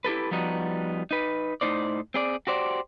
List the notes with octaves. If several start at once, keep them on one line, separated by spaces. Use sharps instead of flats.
E4 G4 A4 B4
F3 G3 B3 D#4 F#4
D#4 B4
A2 C4 D#4 C5 D5
C4 G#4 D5
F#4 G4 C5 D5